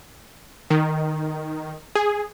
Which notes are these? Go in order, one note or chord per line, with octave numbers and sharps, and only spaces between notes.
D#3
G#4